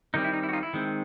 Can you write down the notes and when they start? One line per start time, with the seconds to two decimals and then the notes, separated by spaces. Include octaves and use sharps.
0.14 D#3 G3 C4 D#4
0.24 E4
0.34 D#4
0.43 E4
0.49 F#4
0.53 D#4 F4
0.63 E4
0.73 D#3 G#3 C4